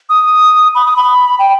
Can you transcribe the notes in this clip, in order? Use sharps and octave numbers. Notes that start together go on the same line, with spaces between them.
D#6
B5
D#6
B5
G5